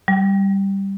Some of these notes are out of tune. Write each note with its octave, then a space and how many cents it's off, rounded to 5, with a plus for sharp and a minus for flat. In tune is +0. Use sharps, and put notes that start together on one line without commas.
G3 +0 G5 -30